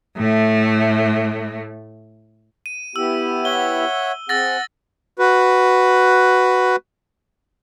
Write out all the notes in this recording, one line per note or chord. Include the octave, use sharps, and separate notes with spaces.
A2 A3
D#7
B3 E4 G4 E6
C#5 E5 F#5 G7
C4 G#4 F#5 E6 A6 A#6
F#4 B4